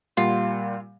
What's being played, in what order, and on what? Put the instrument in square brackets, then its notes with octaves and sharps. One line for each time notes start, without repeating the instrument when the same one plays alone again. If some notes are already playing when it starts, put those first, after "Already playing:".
[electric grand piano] A#2 G3 F#5 [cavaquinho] F4